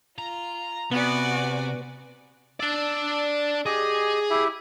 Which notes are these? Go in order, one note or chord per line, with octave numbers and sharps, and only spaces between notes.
F4 A#5
C3 B3 F#4 D5 G#5
D4 D5 E6
G4 G#4 D#5
E4 G4 E5